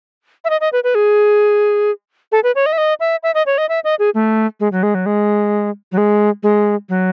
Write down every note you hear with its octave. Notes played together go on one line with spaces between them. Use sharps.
E5
D#5
D#5
B4
B4
G#4
A4
B4
C#5
D#5
E5
D#5
E5
E5
D#5
C#5
D#5
E5
D#5
G#4
A3
G#3
F#3
G#3
F#3
G#3
F#3
G#3
G#3
F#3